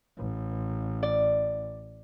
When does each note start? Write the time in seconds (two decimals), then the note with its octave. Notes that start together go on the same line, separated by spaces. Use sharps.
0.18 A1
1.03 D5